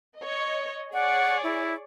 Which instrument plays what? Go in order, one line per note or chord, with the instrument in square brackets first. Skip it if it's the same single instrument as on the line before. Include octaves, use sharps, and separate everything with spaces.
[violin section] C#5 D#5
[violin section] G#4 C#5 D5 [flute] F#5
[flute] E4